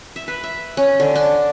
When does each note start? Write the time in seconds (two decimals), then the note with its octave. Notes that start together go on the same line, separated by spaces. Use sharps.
0.16 E5
0.28 B4
0.44 E5
0.77 C#4
1.00 D3
1.16 D4